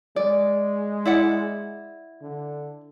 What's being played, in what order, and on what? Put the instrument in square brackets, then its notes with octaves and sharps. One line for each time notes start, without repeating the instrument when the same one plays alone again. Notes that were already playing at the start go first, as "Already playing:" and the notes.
[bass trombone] G#3 [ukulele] D5
[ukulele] E4 D5 F#5
[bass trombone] D3